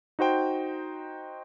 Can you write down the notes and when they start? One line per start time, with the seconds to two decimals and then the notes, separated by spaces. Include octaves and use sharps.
0.19 D#4 F#4 C5 G5